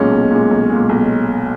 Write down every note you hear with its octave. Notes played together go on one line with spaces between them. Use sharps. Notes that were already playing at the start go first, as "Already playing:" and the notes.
Already playing: B1 A#2 G#3 C#4
B1
A#2 G#3
B1
A#2 G#3
B1